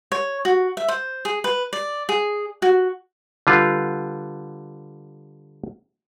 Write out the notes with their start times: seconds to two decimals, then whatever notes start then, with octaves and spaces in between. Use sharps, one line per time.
0.12 C#5
0.45 F#4
0.77 E5
0.88 C5
1.25 G#4
1.44 B4
1.73 D5
2.09 G#4
2.62 F#4
3.47 D3 G3 F4 B4